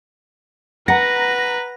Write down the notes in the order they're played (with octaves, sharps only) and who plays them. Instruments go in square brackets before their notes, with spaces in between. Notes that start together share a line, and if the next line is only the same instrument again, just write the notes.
[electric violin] B4 [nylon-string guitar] F#5 [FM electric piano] A#5 A#6